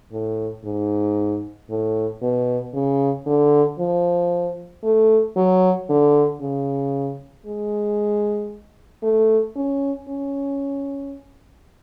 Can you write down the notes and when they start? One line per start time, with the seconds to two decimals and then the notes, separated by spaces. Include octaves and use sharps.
0.12 A2
0.65 G#2
1.70 A2
2.22 B2
2.74 C#3
3.26 D3
3.79 F3
4.84 A3
5.36 F#3
5.89 D3
6.41 C#3
7.46 G#3
9.03 A3
9.56 C#4
10.08 C#4